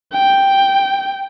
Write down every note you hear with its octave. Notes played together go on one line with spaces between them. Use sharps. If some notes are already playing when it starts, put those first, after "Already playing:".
G5